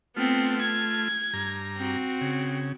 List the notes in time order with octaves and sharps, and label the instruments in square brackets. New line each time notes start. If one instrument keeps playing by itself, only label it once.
[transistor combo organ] A3 F4 [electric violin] B3 C4
[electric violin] G#6
[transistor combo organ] G2 A#5
[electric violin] C4 F#4
[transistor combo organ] C#3